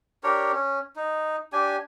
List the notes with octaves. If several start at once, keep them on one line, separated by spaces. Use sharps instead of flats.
D4 G4 A#4 C#5
C#4
D#4
D4 G4 G#5